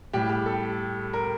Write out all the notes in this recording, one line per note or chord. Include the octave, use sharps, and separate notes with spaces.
A2 G3 G4
G4
A4
A#4